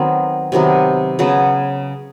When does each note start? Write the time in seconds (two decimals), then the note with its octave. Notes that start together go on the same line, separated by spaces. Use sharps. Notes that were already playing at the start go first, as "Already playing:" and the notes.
Already playing: D#3 F#3 B3 C4
0.52 C3 D#3 F#3 B3
1.19 C#3 F#3 B3